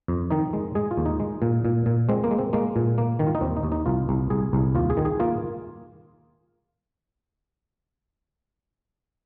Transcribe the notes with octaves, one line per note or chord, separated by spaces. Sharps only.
F2
D#3 D#4
G#3
G#3 G#4
F4
D#2
D#4
G#3
A#2
A#2
A#2
G#3 C4
A#3
G#3
C4
G#3 A#3
A#2
A#3
D#3
F4
D#4
D#2 C4
D#4
D#2
D#4
C2 F4
C2
C2 G#4
C2
D#2 F4
G#4
D#3
G#4
A#3 F4